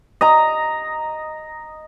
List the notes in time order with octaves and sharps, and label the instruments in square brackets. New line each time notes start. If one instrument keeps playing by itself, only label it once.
[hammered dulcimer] D#5 A#5